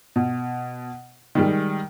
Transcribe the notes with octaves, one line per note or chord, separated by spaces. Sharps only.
B2
D#3 G3 G#3